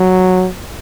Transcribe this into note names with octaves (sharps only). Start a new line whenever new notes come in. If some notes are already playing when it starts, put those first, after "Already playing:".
Already playing: F#3